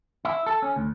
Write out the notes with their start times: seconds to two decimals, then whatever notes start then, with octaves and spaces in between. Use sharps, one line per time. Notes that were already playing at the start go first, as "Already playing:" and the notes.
0.25 E4
0.46 A4
0.62 C#4
0.76 D2